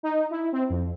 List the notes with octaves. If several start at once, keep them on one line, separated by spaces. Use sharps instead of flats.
D#4
E4
C4
F2